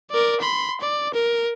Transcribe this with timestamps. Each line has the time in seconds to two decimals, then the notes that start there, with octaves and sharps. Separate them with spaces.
0.11 A#4 D5
0.40 B5 C6
0.81 D5
1.14 A#4